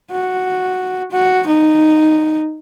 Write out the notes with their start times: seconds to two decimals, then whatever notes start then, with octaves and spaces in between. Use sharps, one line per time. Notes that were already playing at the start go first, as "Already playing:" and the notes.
0.12 F#4
1.12 F#4
1.46 D#4